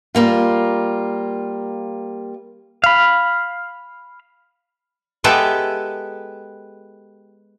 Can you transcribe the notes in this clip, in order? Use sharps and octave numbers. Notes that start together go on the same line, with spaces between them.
G3 A#3 F4
F5 B5
G#3 B3 G4 A4 E5